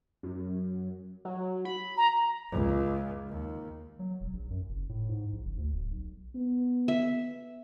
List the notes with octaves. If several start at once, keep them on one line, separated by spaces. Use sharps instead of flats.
F#2
F#3
B5
A#5
C#2
D#2
F#3
E1
A#1
F#2
F#1
A2
G#2
A#1
F#1
D2
D1
B1
B3
E5